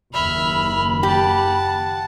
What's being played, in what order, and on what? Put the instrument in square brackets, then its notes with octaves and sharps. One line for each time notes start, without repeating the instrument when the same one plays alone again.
[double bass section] F#1 D#2 [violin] E5 F6 [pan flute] B5
[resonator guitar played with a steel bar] G4 [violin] F#5 A5